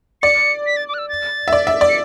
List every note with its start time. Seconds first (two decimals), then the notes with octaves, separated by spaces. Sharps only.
0.22 D5 C#7
0.66 B6
0.77 A6
0.88 D6
0.94 F#6
0.98 E6
1.09 A6
1.48 E5
1.53 D5
1.67 E5
1.81 D5
1.89 C#7